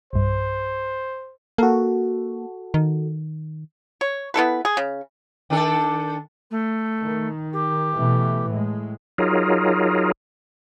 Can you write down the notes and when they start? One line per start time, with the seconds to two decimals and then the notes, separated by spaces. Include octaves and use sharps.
0.13 B1 G2 C5
1.58 A#3 F#4 A4
2.74 D#3
4.01 C#5
4.34 B3 E4 A4 B4
4.65 G#4
4.77 C#3
5.50 D#3 D4 A4
6.50 A3
7.03 D#3
7.53 G4
7.95 B2 E3 A3
8.49 A2 G#3
9.18 F#3 D#4 F4 G#4 A#4